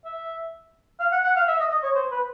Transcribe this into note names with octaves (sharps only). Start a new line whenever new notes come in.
E5
F5
F#5
F#5
F5
E5
D#5
D#5
C#5
C5
B4